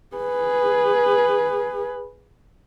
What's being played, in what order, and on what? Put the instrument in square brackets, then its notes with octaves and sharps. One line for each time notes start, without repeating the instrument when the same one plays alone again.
[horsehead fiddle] G#4 B4